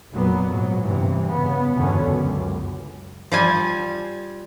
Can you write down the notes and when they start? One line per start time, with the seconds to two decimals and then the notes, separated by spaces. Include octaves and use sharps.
0.12 F1 A#2 F#3 A#3 B3
0.48 G#2 F#3
0.85 E2 G2 C3 E3
1.29 C#3 B3
1.74 E2 G2 B2 D3 B3 C#4
2.04 C#2 F#2
3.32 F3 G3 G#5